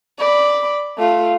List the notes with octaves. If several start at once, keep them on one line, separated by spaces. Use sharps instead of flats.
D5 B5
A3 F4